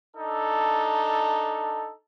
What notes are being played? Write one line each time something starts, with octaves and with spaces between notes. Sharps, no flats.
D4 D#4 A4